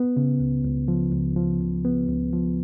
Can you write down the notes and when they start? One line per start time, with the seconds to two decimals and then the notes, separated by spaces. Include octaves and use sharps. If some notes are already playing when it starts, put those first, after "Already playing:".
Already playing: B3
0.17 C#3
0.40 C#2
0.64 C#2
0.88 F3
1.12 C#2
1.36 F3
1.60 C#2
1.85 B3
2.09 C#2
2.33 F3